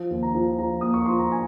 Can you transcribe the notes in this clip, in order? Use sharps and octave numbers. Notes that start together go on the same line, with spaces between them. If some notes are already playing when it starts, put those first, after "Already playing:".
Already playing: F3
D#2
A#5
F3
F3 A#5
A#3 D#6
C#6
F3 C6
A#5
G#5